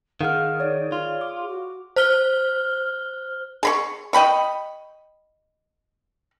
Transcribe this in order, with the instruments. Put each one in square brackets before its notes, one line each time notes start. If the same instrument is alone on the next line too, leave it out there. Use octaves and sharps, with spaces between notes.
[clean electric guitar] D#3 [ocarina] G#4 [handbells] F5 F#5 F6
[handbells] C#5 D5
[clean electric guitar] F4
[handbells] D6
[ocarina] F#4
[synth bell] C5 F6 G7
[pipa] G#4 B5 C#6
D#5 G5 B5 C#6